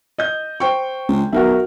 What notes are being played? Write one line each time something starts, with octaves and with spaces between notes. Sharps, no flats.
D#5 G6
C5 G5 C#6
C#2
B1 F#4 A#4 E5